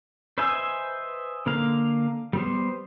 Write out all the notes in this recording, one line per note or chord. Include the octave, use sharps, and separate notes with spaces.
B4 C5 D#5 E5 G#5
D3 A#3 F5
G3 B3 C5